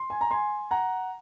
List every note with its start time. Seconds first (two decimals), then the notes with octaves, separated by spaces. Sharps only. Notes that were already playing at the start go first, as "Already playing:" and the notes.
Already playing: C6
0.10 G#5
0.21 A#5
0.31 G#5 C6
0.71 F#5 A#5